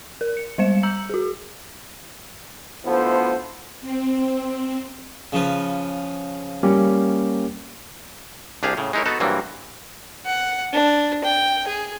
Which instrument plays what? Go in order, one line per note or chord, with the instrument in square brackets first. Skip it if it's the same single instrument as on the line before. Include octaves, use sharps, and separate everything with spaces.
[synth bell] A#4
C#7
G3 G#3 C5 F5 C#7 E7
A#5 E6 G6 C#7 F#7
F#4 G#4
[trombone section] D2 F3 B3 E4 A4 C5
[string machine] C4
[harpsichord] C#3 F3 B4
[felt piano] G3 [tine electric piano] A#3 C#4 G4
[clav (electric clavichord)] C2 D4 G4 G#4 F5
A2 C#3
G#3 D#4 E4 A#4 C#5
B3 D#4 F#4 A4 A5
G2 E3 F#3 G3 A#3 C4
[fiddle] F#5
D4
G5
G#4